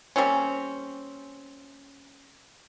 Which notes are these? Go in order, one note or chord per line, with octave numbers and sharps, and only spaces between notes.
G3 A#3 C4 C#4